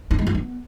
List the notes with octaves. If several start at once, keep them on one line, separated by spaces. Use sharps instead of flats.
E4
G#3
F4
B3